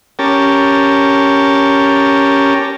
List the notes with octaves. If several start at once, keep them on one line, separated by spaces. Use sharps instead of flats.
C#4 G4 A#4 A5